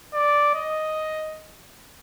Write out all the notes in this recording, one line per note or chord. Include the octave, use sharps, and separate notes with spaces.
D5
D#5